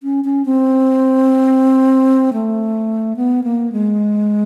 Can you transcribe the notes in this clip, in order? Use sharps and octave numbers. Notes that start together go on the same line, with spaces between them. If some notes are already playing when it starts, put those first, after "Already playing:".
C#4
C#4
C4
A3
B3
A#3
G#3